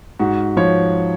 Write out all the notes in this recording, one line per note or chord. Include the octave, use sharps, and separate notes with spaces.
G#2 F#4
F3 C#5